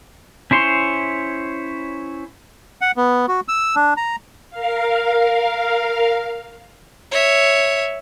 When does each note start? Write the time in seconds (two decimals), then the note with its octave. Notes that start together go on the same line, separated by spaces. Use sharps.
0.51 C#4 E4 C5 C#5 C6
2.81 F#5
2.97 B3
3.28 F#4
3.48 E6
3.76 D4
3.97 A#5
4.50 A#4 F5
7.11 C#5 E5